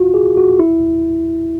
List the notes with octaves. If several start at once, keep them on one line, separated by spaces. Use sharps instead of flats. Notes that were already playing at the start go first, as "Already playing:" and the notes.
Already playing: F4 F#4
G#4
F#4
E4